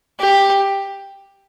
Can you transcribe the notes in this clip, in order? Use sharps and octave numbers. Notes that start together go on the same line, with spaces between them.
G4